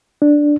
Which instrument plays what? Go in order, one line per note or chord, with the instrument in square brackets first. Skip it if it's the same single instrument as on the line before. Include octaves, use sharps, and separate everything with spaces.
[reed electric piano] D4